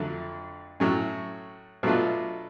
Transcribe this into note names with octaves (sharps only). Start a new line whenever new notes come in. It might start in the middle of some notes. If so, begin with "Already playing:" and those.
Already playing: F2 D3 F#3 A3
A2 F#3 A3 C#4
B2 F#3 A3 D4 F4